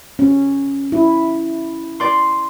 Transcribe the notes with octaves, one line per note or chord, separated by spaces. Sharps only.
C#4
E4
D5 C6